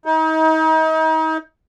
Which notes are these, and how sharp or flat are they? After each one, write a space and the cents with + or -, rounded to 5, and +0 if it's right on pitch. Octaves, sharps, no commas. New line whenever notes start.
D#4 +35